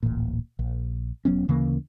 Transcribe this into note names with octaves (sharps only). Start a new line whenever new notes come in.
D1 A1 A#2
A#1
E1 F#3 B3 C#4
D2 C#3 E3 A#3